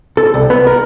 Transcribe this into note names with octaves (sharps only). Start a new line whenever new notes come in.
A4
C2
B3
A#4